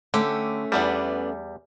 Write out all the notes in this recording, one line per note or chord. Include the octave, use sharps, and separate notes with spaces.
D3 A3 C#4 G4
E2 E3 G3 B3 D4